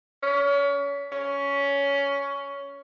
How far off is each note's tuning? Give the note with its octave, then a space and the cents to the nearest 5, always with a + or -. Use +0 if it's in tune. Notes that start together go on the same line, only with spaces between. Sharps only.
C#4 +30
C#4 +15